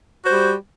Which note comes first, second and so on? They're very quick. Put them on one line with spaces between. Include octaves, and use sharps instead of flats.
F#4 C5 G3